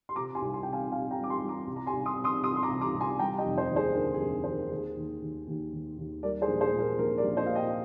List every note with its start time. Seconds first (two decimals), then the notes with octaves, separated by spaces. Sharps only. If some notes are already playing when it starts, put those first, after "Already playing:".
0.09 C6
0.16 C3 A#5 D6
0.35 G#5 C6
0.42 C2
0.54 G#5 C6
0.63 C3 G5
0.73 F5 G#5
0.92 C3 F5 G#5
1.11 G5 A#5
1.17 G3
1.24 D6
1.30 G#5 C6
1.42 G3
1.48 A#5 D6
1.67 C2
1.76 A#5
1.86 G#5 C6
1.93 C2
2.06 C6 D#6
2.18 C3
2.24 C6 D#6
2.44 C3 C6 D#6
2.56 C6
2.63 A#5 D6
2.68 C2
2.81 A#5 D6
2.94 C2
3.01 G#5 C6
3.19 G3 G5 A#5
3.38 D#5 G5
3.45 F1
3.58 C5 D#5
3.70 D#2
3.76 G#4 C5
3.95 D3 A#4
4.14 G#4
4.20 F1
4.44 D#2 C5
4.52 A#4
4.71 D#2 G#4
4.96 D#2
5.22 D#2
5.47 D#2
5.73 D#3
5.98 D#2
6.23 G3 A#4 D5
6.42 G#4 C5
6.48 A#1
6.61 G#4 C5
6.74 A#2
6.80 A#4
6.99 A#1 A#4
7.18 A#4 D5
7.24 A#1
7.37 C5 D#5
7.46 A#2 F5
7.55 D#5 G5